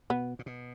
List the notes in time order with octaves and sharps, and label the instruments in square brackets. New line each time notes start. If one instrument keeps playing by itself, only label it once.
[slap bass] B2 [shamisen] B3
[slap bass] A#2
B2